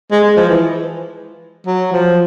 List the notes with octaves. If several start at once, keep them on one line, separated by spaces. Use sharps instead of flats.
G#3
G#3
F3
E3
F#3
F3